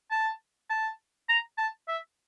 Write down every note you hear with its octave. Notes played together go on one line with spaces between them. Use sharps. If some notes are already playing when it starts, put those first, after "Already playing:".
A5
A5
A#5
A5
E5